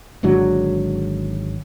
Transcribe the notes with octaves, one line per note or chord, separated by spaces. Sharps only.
G#1 G#2 D3 F#3